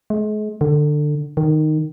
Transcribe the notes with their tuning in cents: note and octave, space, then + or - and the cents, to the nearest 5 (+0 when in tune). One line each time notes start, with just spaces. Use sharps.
G#3 +40
D3 +20
D#3 -10